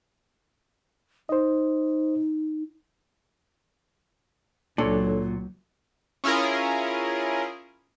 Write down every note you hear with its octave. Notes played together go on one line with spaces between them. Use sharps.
D#4 C5 D#5
C#2 A#2 F#3 D4 A4 C#5
C#4 E4 F4 G#4 A#4